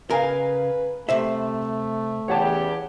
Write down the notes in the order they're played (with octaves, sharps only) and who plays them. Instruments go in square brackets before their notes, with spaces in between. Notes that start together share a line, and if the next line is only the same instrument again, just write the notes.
[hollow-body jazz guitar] C#3 A#4 [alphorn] B4 [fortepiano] F5 G#5 A#5
[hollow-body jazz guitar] C3 C5 E5 [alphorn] A3
[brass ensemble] E2 C#3 G4 [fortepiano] C#5 F#5 A5